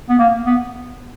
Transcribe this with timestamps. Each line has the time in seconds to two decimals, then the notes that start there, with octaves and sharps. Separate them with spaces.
0.10 B3
0.19 A#3
0.47 B3